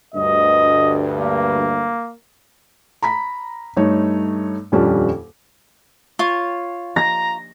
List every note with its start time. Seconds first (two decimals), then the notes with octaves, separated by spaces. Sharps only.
0.14 D2 G2 D#5
1.20 A#3
3.02 A#5 B5 B6
3.77 G2 A3 D#4 C#5
4.72 D#1 F2 G3 C#4 D4
6.19 F4 C#5
6.96 A#5 A#6